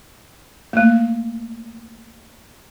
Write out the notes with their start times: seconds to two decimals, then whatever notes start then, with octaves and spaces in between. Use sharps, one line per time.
0.73 A3 A#3